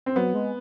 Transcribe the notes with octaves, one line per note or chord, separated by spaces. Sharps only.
C4
F#3 B3
G#3